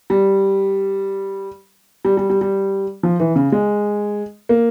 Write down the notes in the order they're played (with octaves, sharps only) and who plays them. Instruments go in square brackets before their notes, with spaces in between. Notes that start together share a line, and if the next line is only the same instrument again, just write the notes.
[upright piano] G3
G3
G3
G3
G3
F3
E3
C#3
G#3
A#3